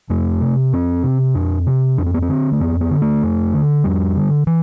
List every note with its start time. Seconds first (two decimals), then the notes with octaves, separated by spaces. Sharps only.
0.10 F2 A3
0.41 C3
0.73 F2 C4
1.03 C3
1.34 F2 D4
1.67 C3
1.98 F2 D4
2.06 C4
2.14 B3
2.22 C4
2.28 D3
2.52 A3
2.60 F2 B3
2.81 B3
2.91 D3
3.02 A3
3.23 F2
3.54 D3
3.84 F2 G3
4.17 D3
4.47 E3